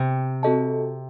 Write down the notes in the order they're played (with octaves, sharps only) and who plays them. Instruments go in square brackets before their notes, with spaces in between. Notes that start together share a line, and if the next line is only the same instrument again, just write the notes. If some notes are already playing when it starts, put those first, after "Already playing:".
Already playing: [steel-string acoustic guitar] C3
[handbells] C4 F#4 A4 D#5 A5